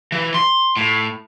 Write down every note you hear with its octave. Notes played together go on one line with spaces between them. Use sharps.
E3
C6
A2